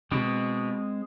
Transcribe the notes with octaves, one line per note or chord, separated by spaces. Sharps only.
B2 G#3 C4